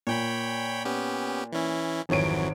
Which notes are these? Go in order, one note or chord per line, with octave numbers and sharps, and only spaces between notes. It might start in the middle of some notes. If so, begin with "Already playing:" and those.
A#2 C#5 G5 B5
B3 C#4 G4
E3 C#4 E4
G#1 F2 E3 F#3 C#5 D7